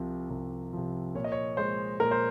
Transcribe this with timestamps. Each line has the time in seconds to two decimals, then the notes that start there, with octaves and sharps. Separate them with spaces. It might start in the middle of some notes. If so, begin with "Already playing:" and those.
Already playing: C2 C3 F3
0.30 C2
0.73 C3 F3
1.15 A#2 C#5
1.24 D#5
1.32 C#5
1.57 G#3 C5
2.00 A#2 A#4
2.11 C5